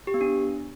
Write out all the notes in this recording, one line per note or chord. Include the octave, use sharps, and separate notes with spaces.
G4
B3
D4